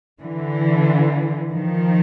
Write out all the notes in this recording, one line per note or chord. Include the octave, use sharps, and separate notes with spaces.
D3 E3
D#3 F3